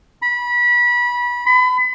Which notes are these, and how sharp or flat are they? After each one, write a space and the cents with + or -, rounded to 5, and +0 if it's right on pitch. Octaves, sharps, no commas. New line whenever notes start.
B5 -25
B5 +35